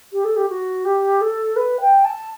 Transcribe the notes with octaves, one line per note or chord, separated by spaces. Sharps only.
G4
A4
G4
F#4
G4
A4
B4
G5
A5